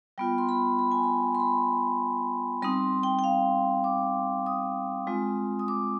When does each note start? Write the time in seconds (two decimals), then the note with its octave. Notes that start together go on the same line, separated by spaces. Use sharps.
0.18 G3 B3 F4 G5
0.38 C6
0.49 B5
0.79 B5
0.92 G#5
1.03 B5
1.35 C6
1.40 B5
2.62 G3 C4 D#4 C6
3.03 G5
3.19 G5
3.24 F5
3.84 D6
4.46 D#6
5.07 G#3 C4 F4
5.59 D#6
5.68 D6